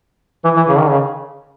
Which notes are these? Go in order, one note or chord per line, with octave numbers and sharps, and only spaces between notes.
E3
E3
C#3
D#3
C#3